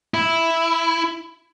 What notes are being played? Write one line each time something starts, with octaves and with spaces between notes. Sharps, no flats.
E4